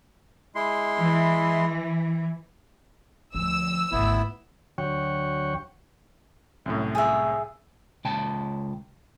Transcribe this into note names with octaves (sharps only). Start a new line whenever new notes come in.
G#3 E4 C6
E3
D2 F3 E6
G#1 D2 B3 E4
D2 F#3 C#5 F#5 G5 C#6
C2 F#2 A2
G#4 E5
C#2 G5 A5